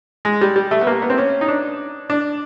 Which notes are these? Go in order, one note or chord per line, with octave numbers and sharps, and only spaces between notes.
G#3
G3
G3
A3
B3
A#3
B3
C4
C#4
D#4
D4
D4